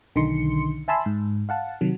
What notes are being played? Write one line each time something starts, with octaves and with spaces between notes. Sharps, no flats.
B1 D3 D#3 D#4 C6 C#7
E5 G#5 A5 B5 C6 E6
G#2
F5 F#5 A5
C3 D#3 F#3